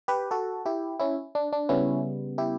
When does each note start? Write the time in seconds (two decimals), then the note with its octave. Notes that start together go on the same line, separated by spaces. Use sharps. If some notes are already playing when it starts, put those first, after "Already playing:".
0.08 G4 B4
0.31 F#4 A4
0.66 E4 G4
1.00 C#4 E4
1.35 D4
1.53 D4
1.69 C#3 G3 B3 C#4 E4
2.38 E4 G4